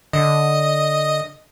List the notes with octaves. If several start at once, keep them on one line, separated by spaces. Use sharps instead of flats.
D3 D#5